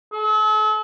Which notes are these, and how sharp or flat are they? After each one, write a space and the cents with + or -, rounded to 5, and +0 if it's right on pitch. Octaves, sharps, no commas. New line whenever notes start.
A4 -40